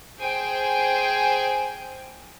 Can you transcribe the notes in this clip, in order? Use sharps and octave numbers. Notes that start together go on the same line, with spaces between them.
G#4 C5 G5 G#5